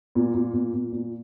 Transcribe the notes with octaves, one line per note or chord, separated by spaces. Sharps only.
A#2
A#2
A#2
A#2
A#2